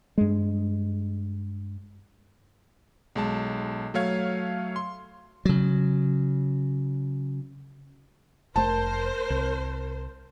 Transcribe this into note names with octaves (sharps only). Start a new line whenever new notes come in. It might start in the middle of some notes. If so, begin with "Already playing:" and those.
G2 G#3
B1 G#3 A5
F#3 A3 C#5 F5 G#6
C6
C#3 F#3
F1 A3 A#4 C5 A5
C2